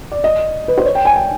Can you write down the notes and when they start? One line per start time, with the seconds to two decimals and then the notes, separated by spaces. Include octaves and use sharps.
0.12 D5
0.24 D#5
0.68 B4
0.78 C5
0.85 C#5
0.95 G5
1.05 G#5
1.16 G5